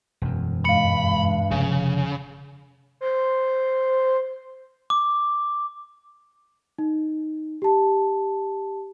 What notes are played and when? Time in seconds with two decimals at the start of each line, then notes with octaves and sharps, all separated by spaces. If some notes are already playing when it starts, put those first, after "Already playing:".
0.22 E1 F#2
0.65 G2 G#3 F5 B5 C#7
1.51 F1 C#3
3.01 C5
4.90 D6
6.78 D#4
7.62 G4 A5